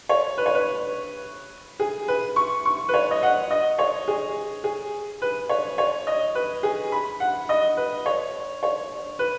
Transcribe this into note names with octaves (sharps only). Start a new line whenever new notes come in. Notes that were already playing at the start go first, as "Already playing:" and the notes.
C#5
B4
C#5
B4
G#4
B4
C#6
C#6
B4
C#5
D#5
F#5
D#5
C#5
G#4
G#4
B4
C#5
C#5
D#5
B4
G#4
B5
F#5
D#5
B4
C#5
C#5
B4